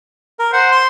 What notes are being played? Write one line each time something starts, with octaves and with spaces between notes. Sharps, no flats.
A#4
C5 F#5
C6